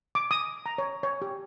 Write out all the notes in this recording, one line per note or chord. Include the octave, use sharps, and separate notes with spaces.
D6
D#6
A#5
C#5
C#5
G4